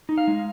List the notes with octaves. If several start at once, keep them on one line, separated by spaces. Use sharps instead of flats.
D#4
F5
G#3